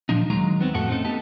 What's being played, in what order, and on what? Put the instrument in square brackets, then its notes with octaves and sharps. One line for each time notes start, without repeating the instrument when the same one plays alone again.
[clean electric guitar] A#2 F3 D4 D#4
D#2 F#3 G#3 D#4 A#5
B3 C4
F2 A2 F#4 A4
A3 C4 C#4 D#4 A4
B3 G4 A4 D#5 A5